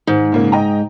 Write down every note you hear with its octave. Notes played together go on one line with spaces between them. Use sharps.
G#2 D#3
A#2 C#3 A#3
D#5 G5 A#5